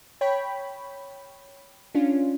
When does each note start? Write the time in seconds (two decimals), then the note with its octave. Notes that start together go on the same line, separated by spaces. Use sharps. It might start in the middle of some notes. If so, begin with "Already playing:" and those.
0.21 C#5 G5 B5
1.95 C#4 D4 F4